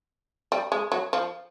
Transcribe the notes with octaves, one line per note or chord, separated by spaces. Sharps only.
G3
G#3
F#3
F3